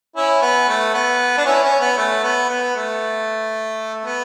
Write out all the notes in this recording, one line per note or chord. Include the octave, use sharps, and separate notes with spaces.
C#4 E4
B3
A3
B3
D4
C#4 E4
C#4
B3
A3
B3
B3
A3
A3
B3